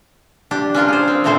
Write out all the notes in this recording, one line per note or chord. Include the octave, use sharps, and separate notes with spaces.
D4 G4
C#4 D4 F4 A#4
G#4 C5
C4
A#2 C#3 A3 C4 C5